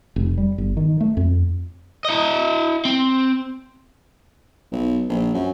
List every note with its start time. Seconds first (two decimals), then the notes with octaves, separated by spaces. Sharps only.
0.16 F1
0.38 G3
0.58 G1
0.77 D#3
1.01 A3
1.17 F2
2.05 E4 D#5
2.85 C4
4.72 B1
5.09 A#1
5.34 F#2